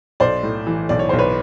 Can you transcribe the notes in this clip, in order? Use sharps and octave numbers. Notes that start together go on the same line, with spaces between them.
B1 C5 D5
A2
E3
B1 D5
C#5
B1 C5
B4 C#5